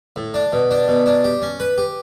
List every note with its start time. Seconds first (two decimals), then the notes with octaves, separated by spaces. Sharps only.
0.16 A2
0.34 D4
0.53 B2
0.71 D4
0.88 B2
1.06 D4
1.24 G4
1.42 C#4
1.60 B4
1.78 G4